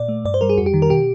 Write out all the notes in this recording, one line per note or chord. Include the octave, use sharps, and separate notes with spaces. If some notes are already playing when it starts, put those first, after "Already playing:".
Already playing: A#2 D5
A3
G2 D5
C5
G3 A#4
G#4
F2 F#4
G4
D#3
A#4
B2 G4